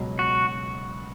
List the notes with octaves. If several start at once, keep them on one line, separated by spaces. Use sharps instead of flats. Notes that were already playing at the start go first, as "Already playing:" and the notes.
Already playing: C#2 B2 F#3
F#4